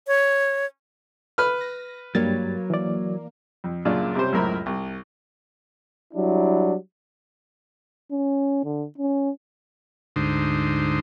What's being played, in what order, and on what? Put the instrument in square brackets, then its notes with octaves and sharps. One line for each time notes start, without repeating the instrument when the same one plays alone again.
[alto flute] C#5
[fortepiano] B4 F6
[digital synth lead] A#6
[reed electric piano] G2 G3 A6 [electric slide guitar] F#3 A#4 C#5 [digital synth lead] A#3
[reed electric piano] E3 D5
[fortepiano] F2
F#2 A#2 C#3 D4 F4 D5
C3 G3 C#4 C5
C#2 F#2 A2 A#4 C5 B5
C2
[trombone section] F#3 G3 D4 E4
[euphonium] C#4
D3
C#4
[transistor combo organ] D2 G#2 D3 D#4 C5